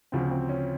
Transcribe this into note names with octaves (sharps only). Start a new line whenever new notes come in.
D2 C#3 F3 C4
C4
C#4